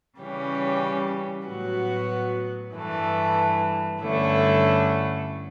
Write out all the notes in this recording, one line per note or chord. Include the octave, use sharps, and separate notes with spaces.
C#3 E3 G3 C#4 G4
A2 F#3 B3 F#4
G2 E3 A3
G2 D3 A3 C#4 E4